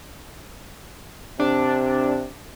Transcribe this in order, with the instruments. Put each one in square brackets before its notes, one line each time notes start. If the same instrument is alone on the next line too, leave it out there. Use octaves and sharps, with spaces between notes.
[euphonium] C3 [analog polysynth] D4